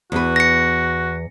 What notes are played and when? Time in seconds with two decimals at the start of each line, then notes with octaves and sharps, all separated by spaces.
0.12 E2 F#4 B4
0.36 A#6 C#7